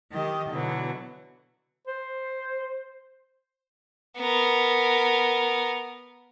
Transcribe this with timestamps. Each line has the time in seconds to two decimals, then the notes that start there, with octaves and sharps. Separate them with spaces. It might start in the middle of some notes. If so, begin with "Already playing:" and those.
0.12 D#3 G4 D#5
0.51 B2 D3 E3 F#3
1.87 C5
4.17 B3 A#4